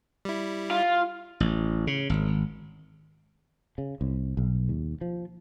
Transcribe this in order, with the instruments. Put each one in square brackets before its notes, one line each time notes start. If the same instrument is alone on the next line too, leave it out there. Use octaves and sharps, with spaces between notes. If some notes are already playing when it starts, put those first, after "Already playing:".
[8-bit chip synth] G3 E4
[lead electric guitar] F4
[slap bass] A1
C#3
G#1
[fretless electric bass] C#3
C2
B1
D#2
F3